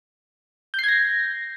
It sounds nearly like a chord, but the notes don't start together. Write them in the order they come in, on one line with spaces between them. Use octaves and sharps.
G6 C7 G#6 A#6